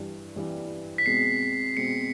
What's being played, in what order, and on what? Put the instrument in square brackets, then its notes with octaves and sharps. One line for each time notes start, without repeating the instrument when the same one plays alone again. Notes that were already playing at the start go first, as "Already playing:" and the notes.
Already playing: [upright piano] G2 E3 G3
G2 E3 G3
[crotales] B6
[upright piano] B2 G#3 C4 [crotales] C7
[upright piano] B2 G#3 C4 [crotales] C#7